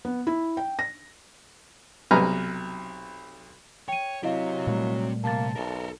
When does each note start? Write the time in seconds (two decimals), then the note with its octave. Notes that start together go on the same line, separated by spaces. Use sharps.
0.05 B3
0.27 E4
0.57 G5
0.79 A#6
2.11 B1 C3 B4 G#5 A#5 F6
3.88 C#5 G5 D#7
4.23 F#3 C4 E4 G4 D#5 F5
4.67 A#2 G3 A3
5.24 C3 A#3 A5 A6
5.55 B1 A4 A#4